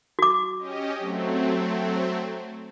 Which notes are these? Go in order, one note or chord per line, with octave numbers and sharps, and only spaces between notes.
F#4 D6
C#4 G4 D#5
F#3 A3 C4